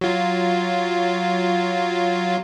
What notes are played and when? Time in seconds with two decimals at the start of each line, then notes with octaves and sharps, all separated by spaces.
0.01 F#3 F4